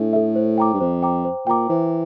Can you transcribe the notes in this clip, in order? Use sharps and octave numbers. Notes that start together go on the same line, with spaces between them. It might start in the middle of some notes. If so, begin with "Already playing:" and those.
Already playing: A2 D4 A4 E5
A4 E5
C5
G5 A#5 D6
G2
F2 C5
G5 A#5 D6
C5
A#2 G5 A#5 D6
E3 C5